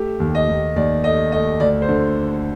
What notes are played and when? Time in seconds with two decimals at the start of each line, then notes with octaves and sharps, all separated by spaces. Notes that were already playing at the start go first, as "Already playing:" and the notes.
Already playing: A3 G4
0.20 D#2
0.35 D#5
0.48 D#2
0.76 D#2 D5
1.04 A3 D#5
1.32 A3 D#5
1.60 D2 D5
1.82 C5
1.89 D3